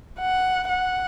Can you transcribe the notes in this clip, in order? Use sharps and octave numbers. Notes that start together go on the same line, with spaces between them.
F#5
F#5